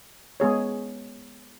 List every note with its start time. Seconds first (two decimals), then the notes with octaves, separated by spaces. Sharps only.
0.40 G#3 B3 G#4 C#5